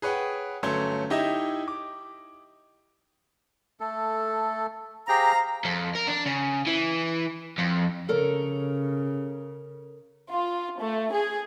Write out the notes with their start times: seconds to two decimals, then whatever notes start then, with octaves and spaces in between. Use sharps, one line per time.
0.02 G#4 B4 C#5 F#5 G5
0.63 G1 F#3 A3 C#4 C6 G#6
1.10 D#4 E4 G4 D#5 E5
1.68 D6
3.80 A3 A4
5.09 G4 G#4 C5 F5 G5 A#5
5.65 F2
5.96 A#4
6.08 D4
6.26 C#3
6.67 E3
7.58 F2
8.09 C#3 A4 A#4 C#5
10.29 F4
10.80 A3
11.12 G#4